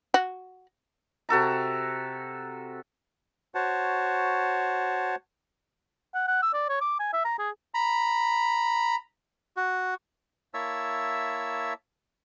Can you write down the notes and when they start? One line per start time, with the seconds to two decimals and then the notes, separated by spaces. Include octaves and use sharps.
0.14 F#4
1.29 C3 F#4 A4 A#5
3.55 F#4 C5 C#5 F#5 A5
6.14 F#5
6.28 F#5
6.42 E6
6.54 D5
6.69 C#5
6.81 D6
7.00 G#5
7.13 E5
7.25 A#5
7.39 G#4
7.74 A#5 B5
9.57 F#4
10.54 A#3 E4 C#5 E5 A5 E6